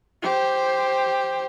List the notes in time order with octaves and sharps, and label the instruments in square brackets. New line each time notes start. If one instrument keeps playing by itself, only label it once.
[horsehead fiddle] G4 C5